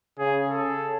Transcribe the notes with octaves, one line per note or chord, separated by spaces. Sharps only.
C#3 G#4
A4